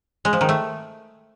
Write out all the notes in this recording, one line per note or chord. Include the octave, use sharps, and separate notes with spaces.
G#3
F3
D#3
A3